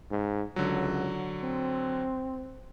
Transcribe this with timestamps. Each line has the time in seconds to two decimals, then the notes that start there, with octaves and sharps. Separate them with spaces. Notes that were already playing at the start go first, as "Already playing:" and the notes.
0.11 G#2
0.56 C#2 D3 F#3
1.43 C4